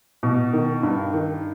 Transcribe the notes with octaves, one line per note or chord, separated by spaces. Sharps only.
B2
D#3
G2
D#3